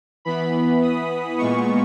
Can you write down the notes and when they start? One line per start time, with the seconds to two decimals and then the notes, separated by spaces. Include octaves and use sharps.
0.25 E3 B3 B5
0.82 D#6
1.38 A#2 G#3 B3 C#6